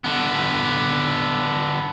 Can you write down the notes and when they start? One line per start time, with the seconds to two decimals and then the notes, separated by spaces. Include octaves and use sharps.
0.04 D3 B3